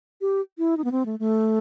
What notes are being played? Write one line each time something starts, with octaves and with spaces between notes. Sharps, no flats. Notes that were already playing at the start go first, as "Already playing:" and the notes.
G4
E4
D#4
B3
C4
A3
A3